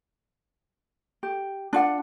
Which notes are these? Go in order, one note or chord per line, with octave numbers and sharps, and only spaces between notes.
G4
D4 F4 F#5